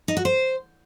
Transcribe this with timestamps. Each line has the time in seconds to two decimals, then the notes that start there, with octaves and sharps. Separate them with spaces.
0.08 D#4
0.17 F#4
0.25 C5